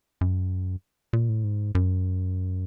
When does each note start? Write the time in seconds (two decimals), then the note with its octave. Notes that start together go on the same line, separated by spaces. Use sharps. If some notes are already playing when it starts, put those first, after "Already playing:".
0.21 F#2
1.13 A#2
1.29 A2
1.44 G#2
1.75 F#2